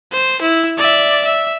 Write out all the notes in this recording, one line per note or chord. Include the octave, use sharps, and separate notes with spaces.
C5
E4
D5 E5
E5